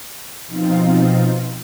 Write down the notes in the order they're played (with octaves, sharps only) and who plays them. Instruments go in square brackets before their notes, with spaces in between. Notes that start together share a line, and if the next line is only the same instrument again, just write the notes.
[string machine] B2 F3 C4 D#4 F4